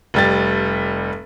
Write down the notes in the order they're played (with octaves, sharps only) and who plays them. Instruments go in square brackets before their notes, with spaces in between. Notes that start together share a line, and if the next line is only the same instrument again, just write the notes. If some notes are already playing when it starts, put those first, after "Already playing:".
[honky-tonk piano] F1 G3 A6